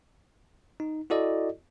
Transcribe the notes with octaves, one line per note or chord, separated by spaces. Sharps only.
D#4
E4 F#4 A4 D5 D#5